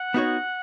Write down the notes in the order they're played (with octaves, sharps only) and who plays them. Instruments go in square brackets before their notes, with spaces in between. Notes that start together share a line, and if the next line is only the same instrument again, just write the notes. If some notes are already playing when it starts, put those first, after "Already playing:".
Already playing: [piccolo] F#5
[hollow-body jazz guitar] B3 D#4 F#4 C#5